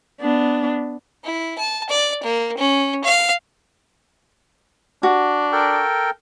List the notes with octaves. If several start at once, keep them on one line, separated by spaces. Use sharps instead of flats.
B3 D4
E4
A5
D5
A#3
C#4
F5
D4 F#4
A4 A#4 G5